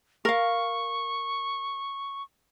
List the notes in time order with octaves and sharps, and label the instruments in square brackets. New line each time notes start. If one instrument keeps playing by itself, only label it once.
[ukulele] A#4 F5 [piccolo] C#6